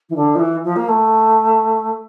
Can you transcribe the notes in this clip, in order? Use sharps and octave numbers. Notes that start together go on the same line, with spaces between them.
E3
D3
F3
E3
F3
A#3
A3